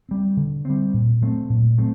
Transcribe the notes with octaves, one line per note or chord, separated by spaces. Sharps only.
G3 C4
D3
G3 C4
A#2
F#3 A3 C4
A#2
F#3 A3 C4